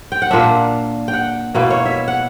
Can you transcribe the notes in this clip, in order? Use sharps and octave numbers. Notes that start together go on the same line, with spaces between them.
G5
F#5
A#2 A#3 D4 E5
G5
F#5
B2 A#3 E4
C#5
E5
F#5